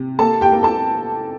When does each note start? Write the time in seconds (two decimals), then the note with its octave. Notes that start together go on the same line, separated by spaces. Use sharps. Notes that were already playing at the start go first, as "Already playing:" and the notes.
Already playing: C3
0.19 A#3 A4 A5
0.41 G4 G5
0.52 A#3
0.63 A4 A5